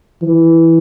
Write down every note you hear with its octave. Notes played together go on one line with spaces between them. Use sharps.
E3